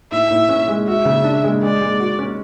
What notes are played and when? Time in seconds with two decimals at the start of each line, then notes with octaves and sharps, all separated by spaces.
0.12 A2 E5
0.31 A2
0.49 C#4
0.68 G#3
0.87 F#4 E5
1.05 C#3
1.24 D4
1.44 G#3
1.62 G#3 D5
1.81 G#3
2.00 F#4
2.19 C#4